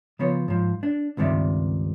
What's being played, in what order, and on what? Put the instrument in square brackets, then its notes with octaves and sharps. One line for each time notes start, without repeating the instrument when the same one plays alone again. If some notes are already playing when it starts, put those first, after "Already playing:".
[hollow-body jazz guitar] C#3 F3 B3 C#5
G#2 F3
D4
C#2 G2 C3 D#3 D5 E5